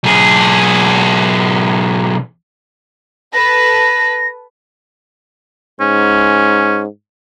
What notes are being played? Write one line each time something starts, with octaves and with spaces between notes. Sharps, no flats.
B1 G#4
A4 B4 A#6
G#2 C#4